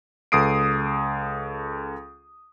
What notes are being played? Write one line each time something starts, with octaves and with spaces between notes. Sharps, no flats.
C#2 A4 D#6 C7 D7